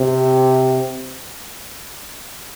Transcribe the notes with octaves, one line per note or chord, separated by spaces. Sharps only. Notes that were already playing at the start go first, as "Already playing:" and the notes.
Already playing: C3